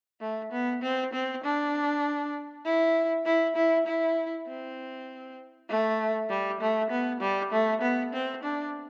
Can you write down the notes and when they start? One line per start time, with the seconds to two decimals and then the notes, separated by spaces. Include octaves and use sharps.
0.21 A3
0.52 B3
0.82 C4
1.13 C4
1.44 D4
2.65 E4
3.25 E4
3.56 E4
3.86 E4
4.47 C4
5.69 A3
6.29 G3
6.61 A3
6.90 B3
7.21 G3
7.52 A3
7.81 B3
8.13 C4
8.43 D4